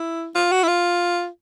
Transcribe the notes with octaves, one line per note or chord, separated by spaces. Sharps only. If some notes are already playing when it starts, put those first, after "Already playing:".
Already playing: E4
F4
F#4
E4
F4